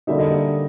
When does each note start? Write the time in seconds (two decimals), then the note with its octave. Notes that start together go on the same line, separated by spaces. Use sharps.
0.07 D3 G3 A#3 D#4 E5
0.19 D#5